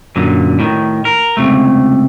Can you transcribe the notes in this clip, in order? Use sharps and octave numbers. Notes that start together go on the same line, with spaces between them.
F#2 A#2 D3
A2 D#3
A#4
C#2 G2 C3 A3